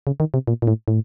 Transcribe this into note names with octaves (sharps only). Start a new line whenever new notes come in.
C#3
D#3
C3
A#2
A#2
A2
A2